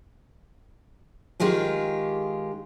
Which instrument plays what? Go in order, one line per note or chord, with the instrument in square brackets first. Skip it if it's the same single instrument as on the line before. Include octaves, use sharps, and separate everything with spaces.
[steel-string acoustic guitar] D#3 G#3 F4 G4 G#4